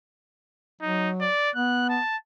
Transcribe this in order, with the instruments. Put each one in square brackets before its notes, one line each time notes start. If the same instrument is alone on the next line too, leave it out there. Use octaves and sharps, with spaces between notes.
[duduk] F#3 [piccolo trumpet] D#4
[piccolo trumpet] D5
[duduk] B3 [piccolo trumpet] F#6
[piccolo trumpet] A5